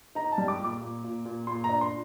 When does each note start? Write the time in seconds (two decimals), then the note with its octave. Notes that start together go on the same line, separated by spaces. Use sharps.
0.15 D#4 A#5
0.32 A5
0.38 G3
0.48 D6
0.60 A#2 D6
0.81 A#2
1.04 A#2
1.25 A#2
1.47 A#2 C6
1.64 A#5
1.69 D4
1.81 C6